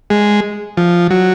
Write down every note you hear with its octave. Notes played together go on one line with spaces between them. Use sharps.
G#3
F3
F#3